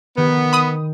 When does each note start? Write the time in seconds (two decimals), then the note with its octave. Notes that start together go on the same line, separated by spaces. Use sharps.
0.17 D#3 B3
0.53 B5 D#6